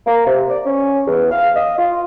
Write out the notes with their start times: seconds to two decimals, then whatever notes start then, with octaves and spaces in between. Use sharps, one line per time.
0.07 A#3
0.26 C3
0.50 D5
0.65 C#4
1.07 E2
1.31 F5
1.56 D#5
1.78 F4